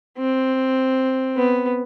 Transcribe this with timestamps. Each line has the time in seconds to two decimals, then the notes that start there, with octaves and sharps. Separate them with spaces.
0.18 C4
1.37 B3